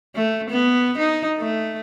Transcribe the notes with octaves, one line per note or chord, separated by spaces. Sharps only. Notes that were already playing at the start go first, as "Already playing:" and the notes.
A3
B3
D#4
A3